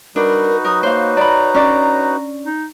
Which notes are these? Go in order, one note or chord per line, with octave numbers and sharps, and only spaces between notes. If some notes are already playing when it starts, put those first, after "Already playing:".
G3 D4 D#4 F#4 A#4 B4
F#3 A#4 D#6
A#3 C5 C#5 F5
D5 A#5 B5
C#4 D4 D5
D#4